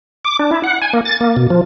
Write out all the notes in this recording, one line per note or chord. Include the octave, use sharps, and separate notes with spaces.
D6
D4
E4
F#5
G#5
A#3
A6
A#3
B2
F3